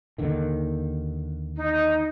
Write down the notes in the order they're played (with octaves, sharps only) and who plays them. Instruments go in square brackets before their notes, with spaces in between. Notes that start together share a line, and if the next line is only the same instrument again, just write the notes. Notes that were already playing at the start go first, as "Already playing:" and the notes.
[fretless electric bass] D#2 D3 D#3
[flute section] D#4